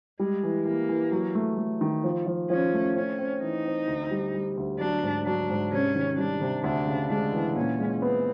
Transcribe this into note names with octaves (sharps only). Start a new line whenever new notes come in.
G3 G#3
E3
E3 A#3
E3
F#3
A3
A3
D#3
F3
F3
F3 C#4
A3
C4 C#4
C4
E3 D#4
C4
D2
G3
G3
D2
F#3 D4
G#2
F#3 D4
G#2
C3 C#4
D#3
G3 D4
C3
D2 D4
C#3
G#3 D4
E3
A#2 C#4
G#3
B3 C4